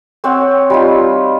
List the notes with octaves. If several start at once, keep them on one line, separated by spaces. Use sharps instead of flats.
C4 C#5 F#5
G3 D#4 F4